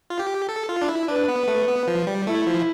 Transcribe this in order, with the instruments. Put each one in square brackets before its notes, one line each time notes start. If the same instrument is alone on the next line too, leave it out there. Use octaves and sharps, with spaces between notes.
[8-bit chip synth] F4
G4
A4
F4
D4
E4
[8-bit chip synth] D4 [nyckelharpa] B4
[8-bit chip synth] B3
A3
B3
F3
G3
[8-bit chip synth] A3 [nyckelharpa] E4
[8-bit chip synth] F3